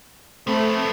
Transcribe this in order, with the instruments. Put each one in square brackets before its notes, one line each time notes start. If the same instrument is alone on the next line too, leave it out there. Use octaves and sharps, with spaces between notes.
[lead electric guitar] F3 B4 [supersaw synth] A3 [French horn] C4